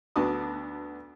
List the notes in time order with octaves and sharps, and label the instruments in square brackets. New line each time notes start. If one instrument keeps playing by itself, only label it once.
[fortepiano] D2 B3 D4 F#4 A5 D#6